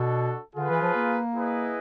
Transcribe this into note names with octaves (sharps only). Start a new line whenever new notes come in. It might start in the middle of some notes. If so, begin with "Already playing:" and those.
Already playing: B2 D4 F#4 A4
D3 F4 G#4 B4
E3
F3
A#3
E4 G#4 B4 D#5